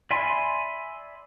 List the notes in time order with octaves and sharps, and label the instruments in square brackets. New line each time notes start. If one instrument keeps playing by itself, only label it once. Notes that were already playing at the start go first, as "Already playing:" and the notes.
[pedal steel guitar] D5 E5 G#5 B5 C6